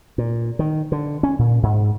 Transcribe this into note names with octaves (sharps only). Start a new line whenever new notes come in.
A#2
D#3
D3
C#4
A#2
G#2